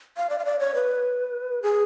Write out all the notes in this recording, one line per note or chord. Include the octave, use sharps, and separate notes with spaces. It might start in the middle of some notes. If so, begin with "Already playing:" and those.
F5
D5
F5
D5
C#5
B4
G#4